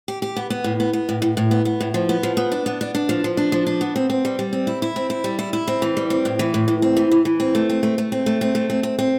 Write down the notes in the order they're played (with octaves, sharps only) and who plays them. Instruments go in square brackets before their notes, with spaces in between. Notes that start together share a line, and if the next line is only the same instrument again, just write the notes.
[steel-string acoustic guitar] G4
G4
B3
B3
A2
B3
B3
A2
A2
A2
B3
B3
A2
F3
B3
F3
B3
D4
B3
D4
D4
F3
F3
D4
F3
D4
B3
C4
C4
G3
G3
C4
E4
E4
C4
E4
G3
E4
E4
C4
E3
G3
C4
A2
E3
A2
A2
C4
E3
E3
E3
C4
A3
C4
A3
A3
C4
A3
C4
A3
C4
C4
C4